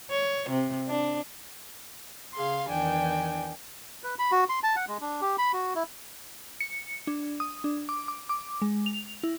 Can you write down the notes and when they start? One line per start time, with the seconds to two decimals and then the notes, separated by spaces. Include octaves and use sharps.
0.11 C#5
0.50 C3
0.88 D4
2.34 C#3 G#4 F5 C6
2.68 E2 D#3 E3 D4 G5 G#5
4.03 B4
4.19 B5
4.32 F#4
4.49 C6
4.63 A5
4.76 F#5
4.88 G#3
5.01 D4
5.21 G4
5.38 B5
5.53 F#4
5.75 E4
6.60 C#7
7.07 D4
7.40 D#6
7.64 D4
7.89 D6
8.08 D6
8.29 D6
8.62 G#3
8.86 F7
9.23 E4